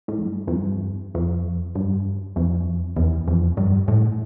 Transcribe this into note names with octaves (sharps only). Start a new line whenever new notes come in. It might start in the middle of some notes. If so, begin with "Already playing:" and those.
A2
F2
G2
F2
G2
F2
G2
F2
E2
F2
G2
A2